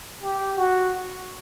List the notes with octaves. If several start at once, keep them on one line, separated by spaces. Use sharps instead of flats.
G4
F#4